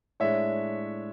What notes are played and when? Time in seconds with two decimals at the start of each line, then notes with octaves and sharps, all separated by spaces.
0.20 A2 G#3 D4 C#5 E5